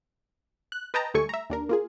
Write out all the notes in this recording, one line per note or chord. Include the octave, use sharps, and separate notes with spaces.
F#6
B4 D#5 G5 A5 A#5
D2 G3 A3 A4 G#5 C#6
E5 A#5
D#2 D4 A#4
A#3 F4 G#4